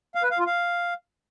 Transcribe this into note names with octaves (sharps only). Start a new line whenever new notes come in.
F5
B4
F5
F4
F5